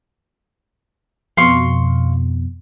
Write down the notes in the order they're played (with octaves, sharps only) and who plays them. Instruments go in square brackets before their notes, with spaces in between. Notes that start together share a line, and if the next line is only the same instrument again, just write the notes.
[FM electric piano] F2 B2 [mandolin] F5 C6 C#6